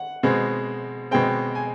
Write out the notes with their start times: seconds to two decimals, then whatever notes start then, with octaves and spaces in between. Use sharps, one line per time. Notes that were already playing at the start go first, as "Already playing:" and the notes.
Already playing: F#5
0.23 B2 G#3 C4
1.11 B2 G#3 C4 G5
1.55 G#5